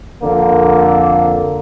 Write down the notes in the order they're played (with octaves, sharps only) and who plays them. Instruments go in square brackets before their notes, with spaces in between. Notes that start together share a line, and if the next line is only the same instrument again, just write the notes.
[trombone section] F2 D3 A#3